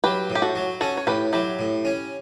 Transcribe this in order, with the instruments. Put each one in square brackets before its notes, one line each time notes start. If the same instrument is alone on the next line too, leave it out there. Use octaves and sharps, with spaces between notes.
[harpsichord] F#3 [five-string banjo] G4 B4
[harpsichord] A2
[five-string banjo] G4
F#4 A4
[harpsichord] F#3
[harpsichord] C#4 [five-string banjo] F#4 A4
[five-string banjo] C#5
[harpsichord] A2 [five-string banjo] G4 B4
[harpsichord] F#3 [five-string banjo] E4 G4
[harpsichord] A2
C#4